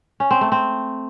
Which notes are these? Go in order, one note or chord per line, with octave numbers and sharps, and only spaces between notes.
C#4
C4
A3
C4